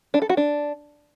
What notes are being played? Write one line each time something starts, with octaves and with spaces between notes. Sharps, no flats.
D4
A4
F#4
D4